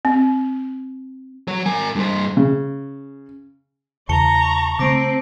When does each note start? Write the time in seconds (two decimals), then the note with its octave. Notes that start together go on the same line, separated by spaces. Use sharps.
0.05 C4
1.48 F#3 C#5
1.66 A#4 G#5
1.95 G2 C5
2.37 C#3
4.09 E2 C#3 A5 A#5 C#6 C#7 G7
4.79 C#3 A3 C4 D6 A#6 D7